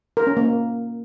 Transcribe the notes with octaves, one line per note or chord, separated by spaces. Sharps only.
A#4
C#4
A#3